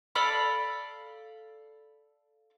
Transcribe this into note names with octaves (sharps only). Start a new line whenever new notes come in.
A4 D5 F5 B5